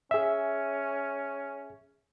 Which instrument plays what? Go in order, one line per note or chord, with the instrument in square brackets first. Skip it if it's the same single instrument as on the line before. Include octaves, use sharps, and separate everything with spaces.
[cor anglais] C#4 [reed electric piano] G#4 E5